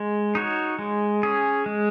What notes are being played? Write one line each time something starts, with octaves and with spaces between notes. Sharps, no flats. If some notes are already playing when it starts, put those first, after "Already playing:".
Already playing: G#3
D#4 F#4 C#5
G#3
C#4 G#4
G#3